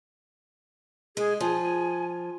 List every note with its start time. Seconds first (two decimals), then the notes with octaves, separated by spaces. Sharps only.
1.17 G#3 G#4
1.40 F3 G#5